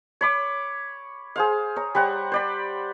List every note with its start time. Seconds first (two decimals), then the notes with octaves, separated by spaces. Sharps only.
0.21 C#5 B5 D6
1.36 G#4 C5 F5
1.76 C#5 A#5
1.95 G3 C5 F#5 A#5
2.32 C5 D5 B5